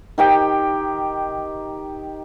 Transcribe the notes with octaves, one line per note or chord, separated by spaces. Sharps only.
D#3 G4 G5